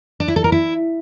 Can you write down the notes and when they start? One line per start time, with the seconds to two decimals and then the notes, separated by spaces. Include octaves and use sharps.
0.20 D4
0.28 E4
0.36 A4
0.44 A#4
0.52 E4